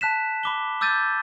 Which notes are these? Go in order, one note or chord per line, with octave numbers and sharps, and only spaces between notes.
A5 F#6 B6 E7
B5 D6 G7
D6 E6 G6 A6 D#7